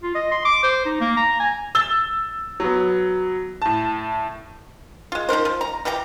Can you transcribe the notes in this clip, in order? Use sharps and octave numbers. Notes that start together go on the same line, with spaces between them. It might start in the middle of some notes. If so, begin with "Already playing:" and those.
F4
D#5
C6
D6
C5
D#4
A#3
A#5
G#5
E6 A6 G7
F#3 B3
A2 A5
G#3 F4
F3 D#4 A#4 C5
F3
A#5
E3 F3 G4 A#5